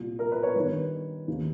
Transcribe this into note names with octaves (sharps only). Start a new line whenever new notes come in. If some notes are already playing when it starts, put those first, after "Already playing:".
Already playing: C2 A#2
A#4
B4
C#5
G2 D#3 B4
D#2 D#3